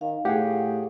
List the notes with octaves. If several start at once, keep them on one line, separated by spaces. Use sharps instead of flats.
D#3 F5
A2 G4 G#4 F#5